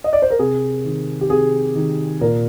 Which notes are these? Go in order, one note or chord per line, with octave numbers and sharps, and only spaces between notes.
D#5
D5
C5
A#4
C3 G#4
D#3
G4
C3 G#4
D#3
A#2 A#4